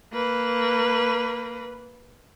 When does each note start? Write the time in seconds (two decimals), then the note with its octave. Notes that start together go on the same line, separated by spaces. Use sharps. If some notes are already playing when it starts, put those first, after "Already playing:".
0.13 A#3 B4